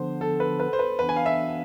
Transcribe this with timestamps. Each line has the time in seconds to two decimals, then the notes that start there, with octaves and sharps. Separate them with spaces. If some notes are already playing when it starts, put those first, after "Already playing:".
Already playing: D3 F3 B3 D4 C5
0.21 A4
0.40 B4
0.60 B4
0.73 C5
0.79 B4
0.99 E3 B3 D4 B4
1.09 G#5
1.16 F5
1.26 E5